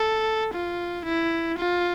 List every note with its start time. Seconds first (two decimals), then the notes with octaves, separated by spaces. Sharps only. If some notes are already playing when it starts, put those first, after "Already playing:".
Already playing: A4
0.54 F4
1.05 E4
1.58 F4